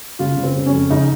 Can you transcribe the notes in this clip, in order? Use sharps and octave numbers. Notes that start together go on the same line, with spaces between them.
C#3 F4
C#3
C4
C#3
C#4
F2
C#3 D#4